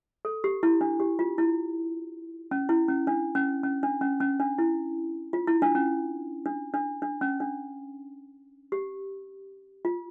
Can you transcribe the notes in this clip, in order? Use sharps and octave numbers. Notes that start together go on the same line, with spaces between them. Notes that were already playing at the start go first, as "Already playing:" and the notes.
A4
G4
E4
D4
G4
F4
E4
C#4
E4
C#4
D4
C#4
C#4
D4
C#4
C#4
D4
E4
F4
E4
D4
C#4
D4
D4
D4
C#4
D4
G4
F4